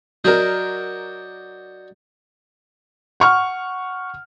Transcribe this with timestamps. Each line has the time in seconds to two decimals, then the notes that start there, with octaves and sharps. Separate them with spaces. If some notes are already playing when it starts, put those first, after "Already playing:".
0.24 F#3 D4 F#4 A#4 D#5 G6
3.20 F#5 C#6 F6